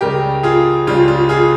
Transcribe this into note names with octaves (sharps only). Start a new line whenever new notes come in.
C#2 C#3 G3 G4 A#4
F4 G#4
C#2 C#3 G3 F4
F4
F4 G#4